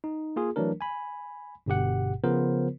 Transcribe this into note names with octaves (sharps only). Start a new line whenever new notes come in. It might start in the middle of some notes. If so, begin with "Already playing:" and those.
D#4
A#3 F4 G#4
E3 F#3 A3 D4 A#4
G#5 B5
G1 G2 B2 G4 F#5
C#3 F3 B3 F4 A#4 C5